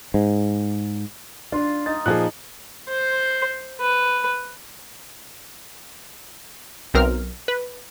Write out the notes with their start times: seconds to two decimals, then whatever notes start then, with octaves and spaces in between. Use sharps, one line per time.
0.14 G#2
1.52 D4 F4
1.86 D#4 A6
2.06 A#2 F3 G#4 F#6
2.89 C5
3.80 B4
6.94 B1 C4 A#4 F6
7.48 B4